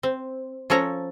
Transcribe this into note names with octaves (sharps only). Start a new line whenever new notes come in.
C4
F3 C#4 A4 C#5 A#5